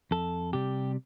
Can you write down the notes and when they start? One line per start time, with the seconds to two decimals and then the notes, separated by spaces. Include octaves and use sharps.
0.11 F2 A4
0.53 C3 G3 G4